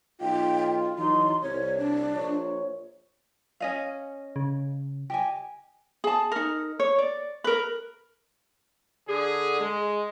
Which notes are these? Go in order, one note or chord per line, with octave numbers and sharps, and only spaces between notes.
B1 D#4 F4 G5
E3 F#3 D#4 C6
C2 C#5
D4
A#1 A#2 C#5
C#4 D#5 F5
C#3
G4 D#5 G#5
G#4 A5
D#4 A#4
C#5
D5
A#4 B4
D3 G#4
G#3